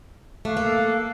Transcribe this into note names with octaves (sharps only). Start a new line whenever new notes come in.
A3 F5 D6 F#6
A#3 A4